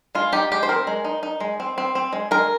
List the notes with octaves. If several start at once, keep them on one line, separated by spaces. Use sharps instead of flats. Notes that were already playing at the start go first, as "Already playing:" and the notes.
G#3 F4
D#4 G4
G#3 G4
C5
C4 A#4
G#3
D#4
D#4
G#3
C4
C4
C4
G#3
G#3 A#4